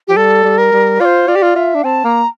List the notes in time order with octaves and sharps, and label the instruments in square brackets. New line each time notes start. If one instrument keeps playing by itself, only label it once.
[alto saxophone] F3 [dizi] G4
[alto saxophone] G3 [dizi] A4
[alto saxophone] G3
[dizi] A#4
[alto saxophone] G3
[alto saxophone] F4 [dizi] D5
[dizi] C5
[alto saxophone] F4 [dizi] D5
[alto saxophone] G4
F4
[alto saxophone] F4 [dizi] E5
[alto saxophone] D4
[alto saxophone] C4 [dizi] A5
[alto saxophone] A#3 [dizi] A#5